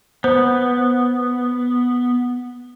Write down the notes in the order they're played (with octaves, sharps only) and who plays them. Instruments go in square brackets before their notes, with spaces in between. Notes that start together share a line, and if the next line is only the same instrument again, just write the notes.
[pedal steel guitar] B3 [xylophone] C5